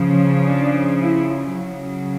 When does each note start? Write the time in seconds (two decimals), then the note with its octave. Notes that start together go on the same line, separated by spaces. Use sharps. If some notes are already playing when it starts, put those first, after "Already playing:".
Already playing: C#3 F3
0.47 D4
1.00 E4
1.52 C#3 F#3